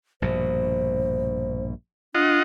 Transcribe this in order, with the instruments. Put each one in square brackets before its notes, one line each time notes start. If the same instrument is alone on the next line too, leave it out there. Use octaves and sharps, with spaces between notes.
[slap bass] A#1 G2 B2 [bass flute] C5
[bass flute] D4 [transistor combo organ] F4 D#5 F#5